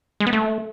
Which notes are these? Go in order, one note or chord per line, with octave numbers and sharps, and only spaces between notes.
G#3
B3
A3